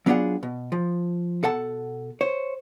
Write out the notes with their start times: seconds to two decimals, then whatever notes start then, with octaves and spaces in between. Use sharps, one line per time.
0.06 F#3 B3 D4 F4 G#4 F#5
0.43 B2
0.72 F3
1.43 B2 A4 F#5 A5
2.21 C5 C#5